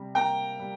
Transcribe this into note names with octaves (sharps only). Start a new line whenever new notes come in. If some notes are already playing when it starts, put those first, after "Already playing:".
Already playing: C3 G3
A#3 G5 A#5
G3